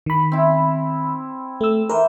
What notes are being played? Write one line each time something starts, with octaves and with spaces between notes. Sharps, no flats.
D#3 B5
C4 E4
A3 E6
E3 A#4 C5